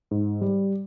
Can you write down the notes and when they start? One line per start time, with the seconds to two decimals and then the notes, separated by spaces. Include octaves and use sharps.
0.11 G#2
0.41 G3